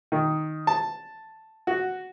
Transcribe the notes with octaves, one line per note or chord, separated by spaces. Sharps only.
D#3
A5
F#4